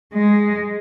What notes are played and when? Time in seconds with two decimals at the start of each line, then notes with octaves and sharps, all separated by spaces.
0.14 G#3